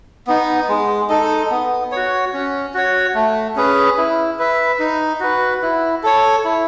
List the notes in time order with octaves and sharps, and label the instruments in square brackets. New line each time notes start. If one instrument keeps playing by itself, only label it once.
[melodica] B3 D#4
G#3
D#4 A4 D#5
B3
F#4 C#5
C#4
F#4 C#5
A3
C#4 G#4 B4
E4
B4 E5
D#4
F#4 B4
E4
A4 C#5
E4